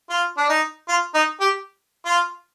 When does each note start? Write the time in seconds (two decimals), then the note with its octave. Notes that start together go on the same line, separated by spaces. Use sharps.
0.10 F4
0.37 D4
0.49 D#4
0.88 F4
1.14 D#4
1.40 G4
2.06 F4